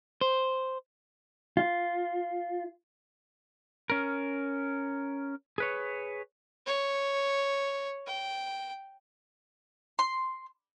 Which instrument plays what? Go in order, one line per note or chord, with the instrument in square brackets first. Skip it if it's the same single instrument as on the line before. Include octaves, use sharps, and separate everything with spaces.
[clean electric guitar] C5
F4
[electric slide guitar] C#4 A#4
G#4 B4 C#5
[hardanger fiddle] C#5
G5
[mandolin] C6